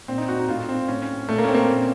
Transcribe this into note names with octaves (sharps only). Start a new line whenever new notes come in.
A#2 C4
D#4
F#4
D#4
A2 F4
C4
A2 C#4
C#4
A#2 A3
A#3
C#4
C4
A#3
C4
A#2